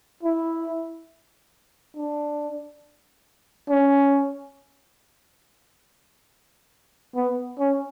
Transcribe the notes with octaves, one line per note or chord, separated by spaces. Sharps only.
E4
D4
C#4
B3
C#4